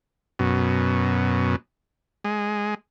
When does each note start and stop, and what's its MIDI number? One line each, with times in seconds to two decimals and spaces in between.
0.39 1.56 42
0.39 1.56 47
2.25 2.75 56